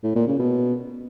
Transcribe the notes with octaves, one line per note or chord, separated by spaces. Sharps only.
A2
A#2
C#3
B2